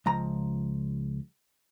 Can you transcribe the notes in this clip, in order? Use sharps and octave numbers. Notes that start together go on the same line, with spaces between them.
C#2 F3 A#5